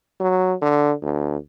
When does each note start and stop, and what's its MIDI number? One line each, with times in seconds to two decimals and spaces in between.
0.20 0.53 54
0.62 0.93 50
1.02 1.37 38